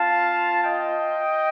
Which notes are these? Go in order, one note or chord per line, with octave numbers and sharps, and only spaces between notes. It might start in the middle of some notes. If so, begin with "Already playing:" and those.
Already playing: C4 F4 F5 A5
D#5 G5